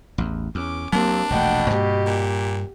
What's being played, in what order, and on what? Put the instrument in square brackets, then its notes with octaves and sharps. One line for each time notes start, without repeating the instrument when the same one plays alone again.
[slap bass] A1 E2
[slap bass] E2 [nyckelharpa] C#4 D6
[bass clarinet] D#2 [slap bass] F#3 A#3 [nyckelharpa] C4 A#4 [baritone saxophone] D4
[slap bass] E1 A#1 A3 [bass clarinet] B2 [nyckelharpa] F#5 G5
[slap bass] G2 A#3 [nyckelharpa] G4
[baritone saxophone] A#2